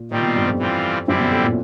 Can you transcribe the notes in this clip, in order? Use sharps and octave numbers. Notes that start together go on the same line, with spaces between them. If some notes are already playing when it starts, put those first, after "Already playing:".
Already playing: A#2
A#2 D#3 G3 C4 F4
B2
G2
F2
E3 G3 C4 F4
F#2 D3 G3 C4 E4
B2
A2
A#2